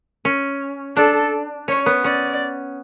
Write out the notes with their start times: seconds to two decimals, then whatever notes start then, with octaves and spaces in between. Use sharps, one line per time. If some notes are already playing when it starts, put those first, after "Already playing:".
0.25 C#4
0.97 D4 A4
1.68 C#4 C#5
1.86 B3
2.04 C#4 D5